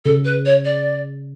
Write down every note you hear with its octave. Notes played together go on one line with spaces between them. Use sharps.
C#3 A4
B4
C#5
D5